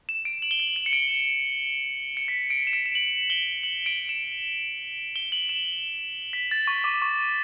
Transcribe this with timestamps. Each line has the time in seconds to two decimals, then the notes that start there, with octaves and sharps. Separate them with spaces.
0.09 E7
0.25 D7
0.42 F#7
0.51 G7
0.60 F#7
0.76 E7
0.86 C#7
0.93 D7
2.17 C#7
2.28 B6
2.50 D7
2.67 E7
2.73 D7
2.86 E7
2.95 F#7
3.30 G7
3.63 F#7
3.86 D7
4.09 E7
5.16 G7
5.32 F#7
5.49 E7
6.33 B6
6.51 A6
6.67 C#6
6.84 D6
7.02 C#6